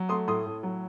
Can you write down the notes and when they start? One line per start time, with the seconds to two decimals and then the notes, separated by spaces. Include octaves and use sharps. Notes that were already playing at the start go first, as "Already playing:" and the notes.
Already playing: F#3
0.09 A3 C6 D#6
0.27 A2 C6 D#6
0.46 A2
0.63 F#3